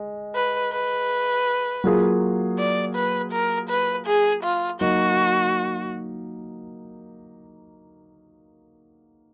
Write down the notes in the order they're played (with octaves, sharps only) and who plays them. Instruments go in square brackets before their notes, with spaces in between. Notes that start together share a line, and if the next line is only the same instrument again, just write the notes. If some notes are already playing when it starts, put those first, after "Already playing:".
Already playing: [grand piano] G#3
[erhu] B4
B4
[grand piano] F#3 A#3 F4 G#4
[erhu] D5
B4
A#4
B4
G#4
F4
[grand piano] F#3 A#3 D#4 [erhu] F#4